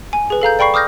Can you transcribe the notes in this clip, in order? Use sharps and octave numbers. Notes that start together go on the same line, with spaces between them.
G#5
G#4 B4
A4 F5 A#5 G6
D5 G5 B5 C#6 C7
D6 D#6 F6 G6 A#6